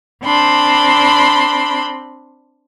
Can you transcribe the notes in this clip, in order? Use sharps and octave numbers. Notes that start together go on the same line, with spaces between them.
C4 D4 B5 C6